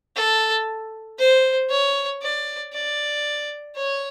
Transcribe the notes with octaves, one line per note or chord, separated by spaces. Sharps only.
A4
C5
C#5
D5
D5
C#5